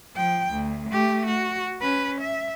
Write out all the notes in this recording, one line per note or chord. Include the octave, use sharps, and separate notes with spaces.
F3 G5
D2
A3 G4
F#4
C#4 B4
E5